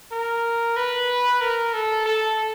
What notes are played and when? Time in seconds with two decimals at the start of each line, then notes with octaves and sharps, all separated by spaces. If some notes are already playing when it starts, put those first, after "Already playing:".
0.12 A#4
0.76 B4
1.41 A#4
1.74 A4
2.06 A4